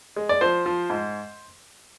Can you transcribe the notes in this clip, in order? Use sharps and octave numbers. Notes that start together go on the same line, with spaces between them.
G#3
D5
F3 C5
F3
G#2